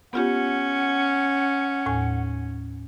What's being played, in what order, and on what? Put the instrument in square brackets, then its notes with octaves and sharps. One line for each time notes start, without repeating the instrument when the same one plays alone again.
[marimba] B3 F4 G4 [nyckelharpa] C#4 [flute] F#5
[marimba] D#2 A2 G#5